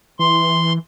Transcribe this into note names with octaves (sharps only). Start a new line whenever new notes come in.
E3 C6